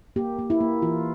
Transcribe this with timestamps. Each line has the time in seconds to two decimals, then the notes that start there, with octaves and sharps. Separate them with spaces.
0.16 A#3 G4
0.39 A#3
0.50 E4
0.60 A#3
0.82 E3 F4